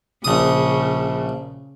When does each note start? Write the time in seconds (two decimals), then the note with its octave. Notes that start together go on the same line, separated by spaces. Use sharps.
0.24 A#1 C#3 D#6